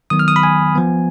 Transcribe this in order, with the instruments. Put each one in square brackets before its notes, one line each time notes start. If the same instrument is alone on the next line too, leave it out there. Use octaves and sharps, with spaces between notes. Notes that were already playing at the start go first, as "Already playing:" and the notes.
[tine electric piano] D#3 F#3 B3 D#6
F6
D#6
B5
G#5
F3 B3